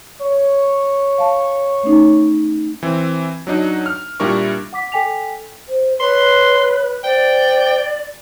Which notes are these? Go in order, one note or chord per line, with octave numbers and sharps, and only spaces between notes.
C#5
F5 A5
A3 C#4 D#4
E3 C4
F#3 D4 D#4
F6
A#2 G3 D4 E4 A#4 C#6
F#5 D6 B6
A4 G5 G#5 B6 F7
C5
B4 C#5 C6
C5 D5 G5